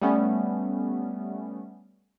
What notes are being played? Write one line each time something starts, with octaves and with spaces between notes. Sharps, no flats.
G3 A3 B3 C#4